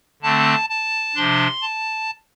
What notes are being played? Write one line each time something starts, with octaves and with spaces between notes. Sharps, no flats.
D3 A3 C4 A5
A5
C3 F3 D4 C6
A5